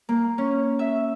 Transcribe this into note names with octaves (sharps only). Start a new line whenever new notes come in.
A#3
C#4
E5